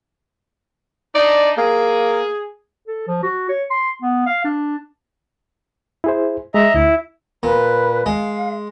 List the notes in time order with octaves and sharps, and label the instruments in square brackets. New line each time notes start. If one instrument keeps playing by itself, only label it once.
[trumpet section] D4 D#4 [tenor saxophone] D5
[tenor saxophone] A#3 [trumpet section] G#4
[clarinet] A4
F3
F#4
C#5
C6
B3
F5
D4
[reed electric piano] E4 G#4 C5
[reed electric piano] G#3 [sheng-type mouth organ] D#5 E5 A#5
[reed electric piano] D2 [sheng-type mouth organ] E4
[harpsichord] A#2 [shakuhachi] B4
[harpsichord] G#3 [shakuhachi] F5